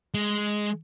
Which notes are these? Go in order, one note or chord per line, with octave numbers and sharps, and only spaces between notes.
G#3